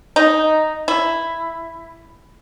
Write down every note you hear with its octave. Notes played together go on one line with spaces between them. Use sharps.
D#4
E4